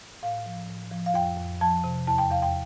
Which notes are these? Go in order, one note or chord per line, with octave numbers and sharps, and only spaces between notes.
A2 F5
F3
A2
F3
F5
F2 G5
F2
F3 A5
C3
E2 A5
G5
E2 F5
G5